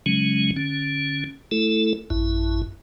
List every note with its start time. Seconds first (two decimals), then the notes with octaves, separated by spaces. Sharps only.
0.06 C#3 F#3 G#3 C#4
0.56 D3 C#4
1.51 A3 E4 A4
2.10 A1 F#2 E4